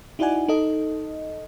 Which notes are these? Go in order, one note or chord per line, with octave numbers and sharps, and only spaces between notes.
D#4 E4 F#4 D5 F#5 G#5
D#4 A4 D#5